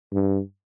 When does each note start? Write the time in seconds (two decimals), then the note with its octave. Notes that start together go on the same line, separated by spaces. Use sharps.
0.13 G2